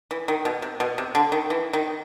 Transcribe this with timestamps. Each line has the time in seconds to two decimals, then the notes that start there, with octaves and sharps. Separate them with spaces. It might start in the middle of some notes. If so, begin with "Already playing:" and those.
0.11 E3
0.28 D#3
0.45 B2
0.62 C3
0.80 B2
0.98 C3
1.15 D3
1.32 D#3
1.50 E3
1.73 D#3